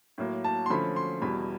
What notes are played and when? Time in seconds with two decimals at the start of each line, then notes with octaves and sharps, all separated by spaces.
0.18 A2 F#3 A#3
0.44 A5
0.66 C6
0.70 D3 F3 A3 C#4 B5
0.96 C6
1.22 E2 B2 G3 B5